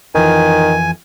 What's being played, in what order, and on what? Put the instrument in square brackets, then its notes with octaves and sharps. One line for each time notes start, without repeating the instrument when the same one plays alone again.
[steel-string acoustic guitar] F2 E3 F4 [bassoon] D#3 [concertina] G#5